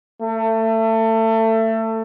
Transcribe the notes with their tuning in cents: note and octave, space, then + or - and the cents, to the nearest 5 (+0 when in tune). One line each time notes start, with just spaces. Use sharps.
A3 +25